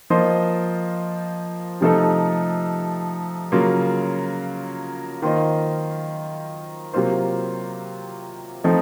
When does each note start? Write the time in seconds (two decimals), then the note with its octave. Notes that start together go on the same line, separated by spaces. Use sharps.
0.10 F3 A#3 F4 C5 D#5
1.81 C3 F3 A3 D#4 A4
3.52 C#3 F#3 A#3 F4
5.22 D#3 A#3 F4 C5 D#5
6.93 C3 F#3 A#3 F4 C5
8.64 F3 A3 C4 D#4